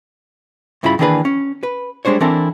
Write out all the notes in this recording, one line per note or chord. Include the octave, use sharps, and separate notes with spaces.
G2 C#3 E4 F4 A4 B5
D#3 E3 A#3 D4 G#4 B4
C#4
B4
G3 G#3 D4 C5 C#5
E3 C4 D4 E4 A4 A#4